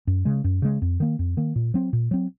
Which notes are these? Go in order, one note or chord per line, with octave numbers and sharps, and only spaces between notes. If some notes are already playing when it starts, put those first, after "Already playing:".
F#2
C#3 G#3
F#2
C#3 G#3
F2
D#3 A#3
F2
D#3 A#3
A#2
F#3 C4
A#2
F#3 C4